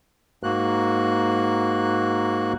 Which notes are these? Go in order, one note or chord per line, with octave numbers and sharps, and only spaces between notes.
G#2 A#3 F#4 F#6